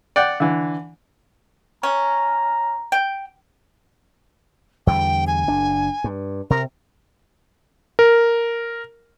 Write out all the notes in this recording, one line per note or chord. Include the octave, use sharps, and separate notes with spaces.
D5 F#5 G5
D3 E3
C#4 A#5
G5
E2 D3 G3 G5
G#5
F#1 D4
G2
C3 A#4
A#4